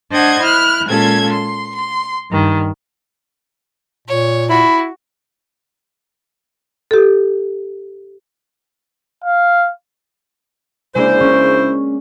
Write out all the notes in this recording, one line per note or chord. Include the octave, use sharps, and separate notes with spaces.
D4 C5 D#5 F#5 G#6
E4 F6 F#6
A#2 G#3 C#4 F4 A4 G#6
C6
C6
G2 D#3
A#2 C#5
E4 F#4 B5
G4 A4
F5
C#3 G#3 A#3 D4 E4 C5
C#4